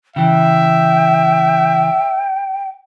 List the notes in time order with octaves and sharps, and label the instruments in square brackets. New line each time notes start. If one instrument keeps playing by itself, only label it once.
[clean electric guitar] C#3 E3 [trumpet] E5 [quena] G5